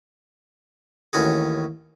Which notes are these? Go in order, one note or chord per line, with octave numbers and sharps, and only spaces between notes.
A1 D#2 C#4 F#4 G#4